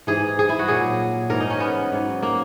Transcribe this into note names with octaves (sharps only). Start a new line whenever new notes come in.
G#2 E3 G#4
G#4
E4
F#4
A#2 F#3 G#4
G#2 E3 A#4
D#4
C#4
B3
G#2 F#3
A#3